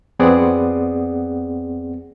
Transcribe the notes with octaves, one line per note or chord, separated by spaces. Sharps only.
F2 B3 C4 G#4 D5 F#5